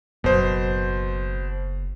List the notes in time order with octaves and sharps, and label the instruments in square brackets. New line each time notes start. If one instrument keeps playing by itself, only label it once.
[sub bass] F#1 [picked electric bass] F#2 [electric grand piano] B2 C5